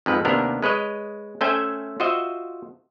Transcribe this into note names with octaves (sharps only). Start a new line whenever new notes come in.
F2 G#2 B4
D#2 C3 B3 D4 A#4
G#3 B4 C#5 D#5
A3 C#4 C5 E5 G5 G#5
F4 F#4 C5 D#5 E5